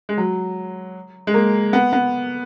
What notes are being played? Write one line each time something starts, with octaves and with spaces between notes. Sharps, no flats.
G#3
F#3
G#3
A#3
B3
B3